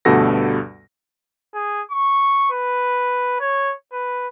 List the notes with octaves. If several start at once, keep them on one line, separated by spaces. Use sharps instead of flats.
D2 G2 B2 A4 F#5 A#6
G#4
C#6
B4
C#5
B4